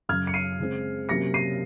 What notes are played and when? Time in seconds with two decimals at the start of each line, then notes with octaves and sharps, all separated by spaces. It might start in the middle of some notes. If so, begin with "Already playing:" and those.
0.09 F#2 C#3 F#3 F6 G#6
0.27 C#7
0.34 C7 D#7
0.59 C#3 G#3 C4
1.09 C3 F#3 A#3 C#4 A#6 C#7
1.34 C7 D#7